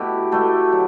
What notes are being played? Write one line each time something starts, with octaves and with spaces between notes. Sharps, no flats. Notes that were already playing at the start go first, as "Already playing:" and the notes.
Already playing: B2 A3 E4 G4
B2 A3 E4 G4
F#3